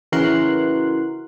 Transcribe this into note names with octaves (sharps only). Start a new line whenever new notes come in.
C#3 E3 F#4 A#4 C6 F#6